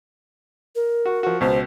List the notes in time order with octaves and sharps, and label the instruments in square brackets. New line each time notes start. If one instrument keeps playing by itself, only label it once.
[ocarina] A#4
[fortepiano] F#4
F3 F#4
[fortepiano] C#2 B2 [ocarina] C5